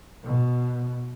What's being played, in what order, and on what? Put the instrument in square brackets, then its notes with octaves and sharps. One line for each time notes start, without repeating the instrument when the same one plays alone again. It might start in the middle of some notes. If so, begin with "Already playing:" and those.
[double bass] B2